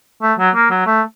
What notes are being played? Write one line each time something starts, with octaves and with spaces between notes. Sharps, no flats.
A3
F#3
A#3
F#3
A3